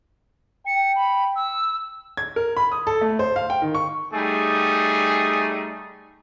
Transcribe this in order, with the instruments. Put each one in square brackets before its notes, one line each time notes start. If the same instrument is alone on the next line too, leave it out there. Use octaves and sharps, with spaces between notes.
[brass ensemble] G5 [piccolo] C#7
[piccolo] B5
E6
[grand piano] G#6
A#4
B5
D#6
A4
A3
C5
F5
G5
D#3
C#6
[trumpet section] G3 A3 D#4 G#4